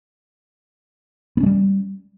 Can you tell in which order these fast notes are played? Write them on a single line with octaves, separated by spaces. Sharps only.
B3 C#4 G#3 G3